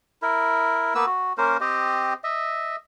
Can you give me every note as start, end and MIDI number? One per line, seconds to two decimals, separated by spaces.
0.22 0.94 64
0.22 0.94 70
0.95 1.06 58
0.95 1.06 59
0.95 1.06 71
0.95 1.06 88
1.06 1.33 66
1.38 1.57 58
1.38 1.57 61
1.38 1.57 70
1.38 1.57 72
1.61 2.14 60
1.61 2.14 67
1.61 2.14 75
2.24 2.76 75
2.24 2.76 76